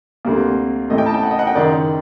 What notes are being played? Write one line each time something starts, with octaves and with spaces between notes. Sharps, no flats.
D2 C3 G3 A#3
A1 A2 A3 D#5
G5
A5
G5
F#5
D#5
F#5
G5
F#1 F#2 D#3 D5